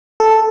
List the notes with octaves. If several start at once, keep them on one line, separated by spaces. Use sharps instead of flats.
A4